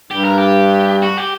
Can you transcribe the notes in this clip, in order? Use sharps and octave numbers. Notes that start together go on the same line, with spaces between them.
G2 G4
A#4
G4
F#4
G4